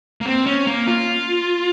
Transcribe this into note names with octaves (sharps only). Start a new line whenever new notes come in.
A#3
C4
C#4
A#3
F4